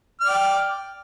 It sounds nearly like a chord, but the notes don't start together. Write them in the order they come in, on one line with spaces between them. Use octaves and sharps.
F6 D5 G5